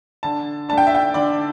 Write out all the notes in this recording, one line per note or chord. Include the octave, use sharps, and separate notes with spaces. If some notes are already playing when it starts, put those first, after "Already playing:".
D3 A5
A3 D4 A5
G5
E5
G5
D3 D5